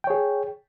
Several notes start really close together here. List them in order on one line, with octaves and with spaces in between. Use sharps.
G5 C#5 G#4